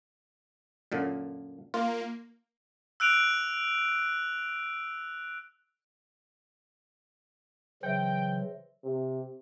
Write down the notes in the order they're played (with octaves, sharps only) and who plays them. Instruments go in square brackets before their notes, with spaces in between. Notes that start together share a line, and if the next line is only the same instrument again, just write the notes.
[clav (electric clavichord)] F#2 A#2 D3
[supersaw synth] A#3 [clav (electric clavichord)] F4
[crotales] E6 F#6 D7 F7
[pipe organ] C#3 E3 F#3 [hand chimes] C5 E5 [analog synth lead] G5
[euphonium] C3